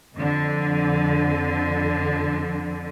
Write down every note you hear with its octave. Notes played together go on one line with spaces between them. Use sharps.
F2 D3